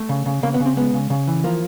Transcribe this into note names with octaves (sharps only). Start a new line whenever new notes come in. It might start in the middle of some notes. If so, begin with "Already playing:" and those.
Already playing: A3
C#3
C#3
C#3 A#3
B3
C#3
C4
G#3 B3
C#3
C#3
E3
F3 A#3